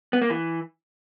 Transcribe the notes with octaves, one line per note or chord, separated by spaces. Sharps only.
B3
A#3
E3